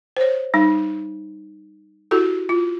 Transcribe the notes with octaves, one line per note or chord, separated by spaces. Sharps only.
C5 C#5
G3 D#4
E4 F#4 G4 A4
F4